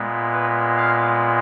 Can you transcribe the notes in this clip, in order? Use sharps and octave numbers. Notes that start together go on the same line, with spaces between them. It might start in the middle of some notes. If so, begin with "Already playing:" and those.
Already playing: A#2 G#3 B3
B4
F5